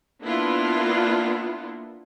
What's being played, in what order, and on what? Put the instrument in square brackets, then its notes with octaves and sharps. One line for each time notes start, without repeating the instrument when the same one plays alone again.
[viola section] A#3 B3 D4 E4 F4